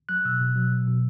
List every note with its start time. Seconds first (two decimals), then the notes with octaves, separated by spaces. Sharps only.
0.09 F#3 F#6
0.25 B2 E6
0.40 B2
0.56 F#3
0.71 B2
0.88 B2